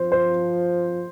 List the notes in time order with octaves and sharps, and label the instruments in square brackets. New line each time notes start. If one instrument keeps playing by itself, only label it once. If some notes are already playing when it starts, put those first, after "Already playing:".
Already playing: [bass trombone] F3 [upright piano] C5
[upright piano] C5